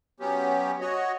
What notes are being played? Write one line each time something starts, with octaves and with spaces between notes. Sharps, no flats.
F#3 B3 C#4 G4
F#4 C#5 D#5